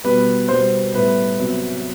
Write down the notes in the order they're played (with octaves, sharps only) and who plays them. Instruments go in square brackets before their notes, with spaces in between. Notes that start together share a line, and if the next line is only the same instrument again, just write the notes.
[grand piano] B2 G3 B3 B4
B2 G3 B3 C5
A2 G3 B3 B4
C3 F#3 B3